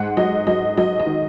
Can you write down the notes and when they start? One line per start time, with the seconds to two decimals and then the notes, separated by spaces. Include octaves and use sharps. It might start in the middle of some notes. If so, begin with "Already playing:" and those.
Already playing: G#2 F#5
0.17 F#3 D#5
0.47 F#3 D#5
0.77 F#3 D#5
1.00 D#5
1.06 D#3